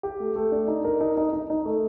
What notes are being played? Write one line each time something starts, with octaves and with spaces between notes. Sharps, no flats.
G4
A3
A3
D4
D#4
A#4
D#4
D#4
D#4
D#4
A3